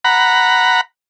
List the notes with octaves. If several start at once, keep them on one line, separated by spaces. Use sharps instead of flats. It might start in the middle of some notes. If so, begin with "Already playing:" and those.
F#5 A#5 B5